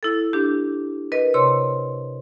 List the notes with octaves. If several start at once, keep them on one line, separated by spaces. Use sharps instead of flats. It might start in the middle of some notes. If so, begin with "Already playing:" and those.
E4 A4
D4 G4
A#4 B4 D#5
C3 C#5 C6